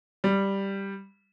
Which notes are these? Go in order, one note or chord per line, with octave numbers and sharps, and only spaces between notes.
G3